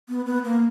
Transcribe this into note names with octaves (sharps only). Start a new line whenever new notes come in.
B3
B3
A#3